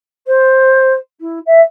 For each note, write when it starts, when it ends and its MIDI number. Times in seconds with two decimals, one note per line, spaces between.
0.27 0.93 72
1.20 1.39 64
1.46 1.60 76